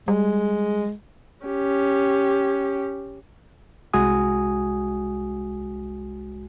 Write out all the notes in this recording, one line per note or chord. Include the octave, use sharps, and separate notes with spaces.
G3 G#3
C#4 G4
C2 G#3 F#4 G#5 D#6